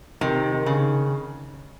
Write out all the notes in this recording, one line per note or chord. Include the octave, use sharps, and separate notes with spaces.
C3 D#3
D#3
C#3